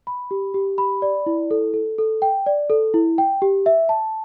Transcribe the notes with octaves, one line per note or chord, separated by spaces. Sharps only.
B5
G4
G4
B5
D5
E4
A4
A4
A4
G5
D5
A4
E4
G5
G4
E5
A5